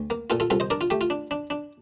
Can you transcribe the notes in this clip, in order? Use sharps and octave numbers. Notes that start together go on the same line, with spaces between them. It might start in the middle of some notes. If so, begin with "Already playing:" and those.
Already playing: D2
A#3
A#2 F4 A4
F4 A4
C2 F4 A4
C5 D#5
D4 A#4 D5
F4
A3 G4
F4
D4
D4
D4